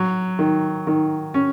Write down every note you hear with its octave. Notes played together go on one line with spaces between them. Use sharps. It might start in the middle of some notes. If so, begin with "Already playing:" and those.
Already playing: F#3
D#3
D#3
C#4